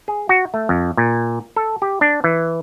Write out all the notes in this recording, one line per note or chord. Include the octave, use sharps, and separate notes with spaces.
G#4
F#4
A3
F2
A#2
A4
G4
D4
E3